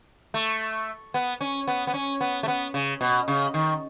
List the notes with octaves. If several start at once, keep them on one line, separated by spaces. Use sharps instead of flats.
A3
B3
C#4
B3
B3
C#4
B3
A3
B3
C#3
B2
C#3
D#3